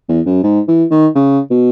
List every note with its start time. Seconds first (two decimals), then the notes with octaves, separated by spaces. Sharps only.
0.09 E2
0.26 F#2
0.43 G#2
0.68 E3
0.91 D#3
1.15 C#3
1.50 B2